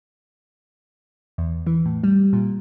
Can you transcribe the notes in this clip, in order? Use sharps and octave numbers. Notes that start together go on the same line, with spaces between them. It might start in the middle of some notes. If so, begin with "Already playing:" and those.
E2
E3
A2
G3
A#2